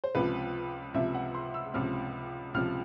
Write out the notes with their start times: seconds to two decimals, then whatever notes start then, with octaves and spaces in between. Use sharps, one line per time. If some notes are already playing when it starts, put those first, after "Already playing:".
0.04 C5
0.15 C#2 C3 F3 B4
0.94 C#2 C3 F3 E5
1.15 F#5
1.35 C6
1.54 E6
1.74 C#2 C3 F3 F6
2.54 C#2 C3 F3 F6